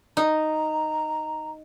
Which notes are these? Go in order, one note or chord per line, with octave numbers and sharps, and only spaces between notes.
D#4 A#5